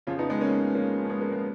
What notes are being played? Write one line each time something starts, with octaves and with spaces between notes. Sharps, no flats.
F2 C#3 F3 C#4 F4
B3 D#4
G#3 B3
A#3 C#4
A#3 C#4
C#4
G#3 B3
A#3
G#3 B3